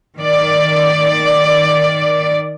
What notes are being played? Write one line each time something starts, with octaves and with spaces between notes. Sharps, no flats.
D#3 D5